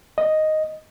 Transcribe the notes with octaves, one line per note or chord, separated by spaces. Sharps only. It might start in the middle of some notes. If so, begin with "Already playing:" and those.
D#5